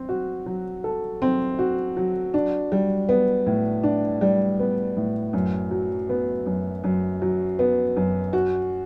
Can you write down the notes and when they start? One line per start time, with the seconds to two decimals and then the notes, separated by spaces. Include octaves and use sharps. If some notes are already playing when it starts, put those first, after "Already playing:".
Already playing: C4
0.09 F#4
0.46 F#3
0.84 A4
1.22 C4
1.59 F#4
1.97 F#3
2.34 D4
2.72 G3
3.09 B3
3.46 A2
3.84 D4
4.21 G3
4.60 B3
4.97 A2
5.33 F#2
5.71 F#3
6.09 B3
6.46 F#2
6.84 F#2
7.22 F#3
7.59 B3
7.96 F#2
8.33 F#4